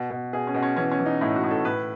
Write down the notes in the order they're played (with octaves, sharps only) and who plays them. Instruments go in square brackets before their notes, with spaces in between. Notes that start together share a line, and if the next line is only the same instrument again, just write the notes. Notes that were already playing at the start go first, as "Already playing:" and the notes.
Already playing: [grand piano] B2
B2
B2 G#4
C#4
B2
C#4
E3 C#4
C#4
E3
D#4
A2 E4
F#4
A2
A4
A2 B4